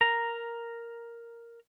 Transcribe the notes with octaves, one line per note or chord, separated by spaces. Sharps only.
A#4 A#5